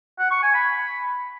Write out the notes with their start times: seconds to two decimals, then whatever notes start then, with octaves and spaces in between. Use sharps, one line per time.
0.19 F#5
0.31 C#6
0.43 G#5
0.54 B5